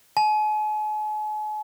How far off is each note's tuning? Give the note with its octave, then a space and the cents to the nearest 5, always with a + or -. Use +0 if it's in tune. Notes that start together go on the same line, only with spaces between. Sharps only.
G#5 +45